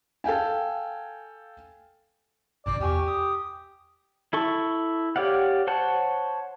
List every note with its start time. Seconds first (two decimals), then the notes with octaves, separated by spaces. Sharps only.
0.24 A4 F5 G5 G#5
2.66 A1 F#2 B2 D5
2.81 E2 G4 G#5 C#6
3.08 D#6
4.33 E4 A4 C#6
5.16 G4 C#5 D5 F5 F#5
5.67 C5 C#5 F#5 A5